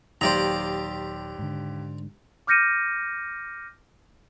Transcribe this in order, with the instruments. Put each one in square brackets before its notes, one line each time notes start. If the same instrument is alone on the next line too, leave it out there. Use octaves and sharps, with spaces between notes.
[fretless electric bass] D#1 F#3 [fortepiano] D#2 G4 [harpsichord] C5 D5 A#5
[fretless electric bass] G#2 D3
[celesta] D6 F6 G6 A#6 C#7 D#7